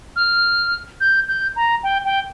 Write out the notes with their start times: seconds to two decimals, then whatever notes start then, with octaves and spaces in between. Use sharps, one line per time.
0.16 F6
1.00 G6
1.28 G6
1.56 A#5
1.83 G5
2.05 G5